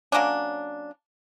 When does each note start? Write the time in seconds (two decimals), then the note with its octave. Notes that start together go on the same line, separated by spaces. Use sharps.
0.12 F#3 A#3 C#4 D4